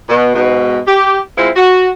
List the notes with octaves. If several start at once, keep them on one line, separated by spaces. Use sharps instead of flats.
B2
G#2 B2
G4
G#3 C4 E4 F4
F#4